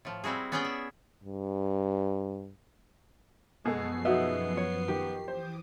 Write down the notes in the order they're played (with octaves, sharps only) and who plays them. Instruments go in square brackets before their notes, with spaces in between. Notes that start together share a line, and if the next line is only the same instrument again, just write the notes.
[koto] A2 F3
G3 C4 E4 F#4 G#4
B3 C#4 G#4 C#5 D5 G5
E5
[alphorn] G2
[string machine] F#2 F3 C7 [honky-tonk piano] B2 G#4 A4 [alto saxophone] G#3
[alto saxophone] B3 [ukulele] D#4 F#4 E5
[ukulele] C#5
[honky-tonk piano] D#3 [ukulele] G4
[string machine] E3 D6 D#6 [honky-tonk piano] C5